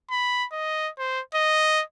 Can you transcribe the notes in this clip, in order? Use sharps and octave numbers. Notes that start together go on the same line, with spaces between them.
B5
D#5
C5
D#5